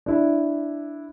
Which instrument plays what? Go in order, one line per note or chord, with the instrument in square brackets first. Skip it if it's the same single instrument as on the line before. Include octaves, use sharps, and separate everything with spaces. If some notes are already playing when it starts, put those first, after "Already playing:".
[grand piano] D4 E4